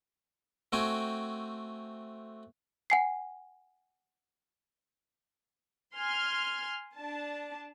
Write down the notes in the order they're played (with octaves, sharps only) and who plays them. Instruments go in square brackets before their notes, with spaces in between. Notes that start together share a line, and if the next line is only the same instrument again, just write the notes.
[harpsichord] A3 C4 F#4 G5 G#5
[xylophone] F#5 G#5 C7
[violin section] G#5 C6 F6 G#6
D4 A5